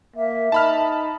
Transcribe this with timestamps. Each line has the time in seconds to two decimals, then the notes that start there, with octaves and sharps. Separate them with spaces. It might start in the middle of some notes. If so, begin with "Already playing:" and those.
0.16 A#3 E5
0.52 D#4 A5 B5 F6